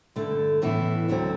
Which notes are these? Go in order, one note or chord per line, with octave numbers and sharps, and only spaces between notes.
G2 D3 A3
A2 E3 B3 E4
D2 D3 F#3 C4